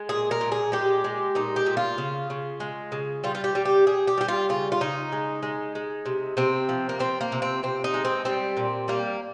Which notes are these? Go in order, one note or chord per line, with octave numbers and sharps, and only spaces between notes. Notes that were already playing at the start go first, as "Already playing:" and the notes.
Already playing: G#3
A#2 G#4
A#4
A#2
G#4
G#3 G4
G#3
A#2 D#4
G4
A#2
F4
C#3
C#3
G#3
C#3
G3 F4
F4
G4
G3
G4
G3 G#4
G4
G3 G4
F4
C#3 F4
F4
C#3 D#4
G#3
G#3
G#3
C3
C3 C4
F3
A#3
F3 C4
A#3
C3
C4
C3 C4
D#4
G#3
C4
G3 C4
A#2
G3 A#3